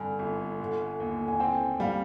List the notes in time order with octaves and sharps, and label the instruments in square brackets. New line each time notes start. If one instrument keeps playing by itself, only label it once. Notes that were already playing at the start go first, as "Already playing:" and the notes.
Already playing: [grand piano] G2 D3 [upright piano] G#5
[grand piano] G1
D3
D#2
[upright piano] G#5
[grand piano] C4 [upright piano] G5
[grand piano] G3 [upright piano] F5